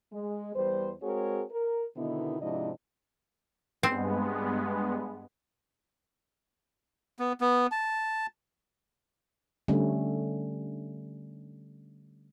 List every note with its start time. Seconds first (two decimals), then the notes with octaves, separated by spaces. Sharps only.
0.13 G#3
0.55 E2 G3 B4 C5
1.02 G#3 C4 F#4 G#4 A#4 C#5
1.51 A#4
1.97 B2 D3 D#3 B3 D#4 E4
2.41 G#2 C3 F3 D4 E4 D#5
3.83 G2 G#3 B3 C4
7.19 B3
7.41 B3
7.72 A5
9.68 D3 G3 A3 C#4